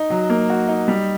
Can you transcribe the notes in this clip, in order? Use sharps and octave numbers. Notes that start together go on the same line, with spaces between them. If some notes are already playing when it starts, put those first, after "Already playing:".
Already playing: D#4
F#3
A#3
F#4
D#4
G3